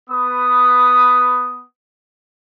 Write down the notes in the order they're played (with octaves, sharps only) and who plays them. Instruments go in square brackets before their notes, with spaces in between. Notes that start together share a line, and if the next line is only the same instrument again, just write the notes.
[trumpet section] B3 B4 D#6